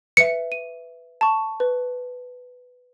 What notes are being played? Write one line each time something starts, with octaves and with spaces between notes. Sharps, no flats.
B4 E5 C#7
D#7
A5 C#6
B4